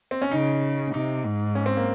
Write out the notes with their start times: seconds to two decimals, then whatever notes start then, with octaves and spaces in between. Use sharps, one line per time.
0.11 C4
0.22 C#4
0.31 C#3 D#4
0.94 C3 D#4
1.25 G#2
1.55 C#4
1.66 C4
1.77 A#3